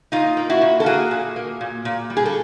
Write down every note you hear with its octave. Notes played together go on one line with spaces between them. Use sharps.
A#2 D#4 F4
A#3
E4 F#4
A#2
A4
A#3 F#4 G#4
A#2
A#3
A#2
A#2
G3
G#4
A4